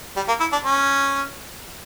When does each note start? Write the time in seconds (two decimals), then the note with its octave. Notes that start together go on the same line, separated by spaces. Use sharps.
0.16 G3
0.28 A#3
0.40 E4
0.53 D4
0.64 C#4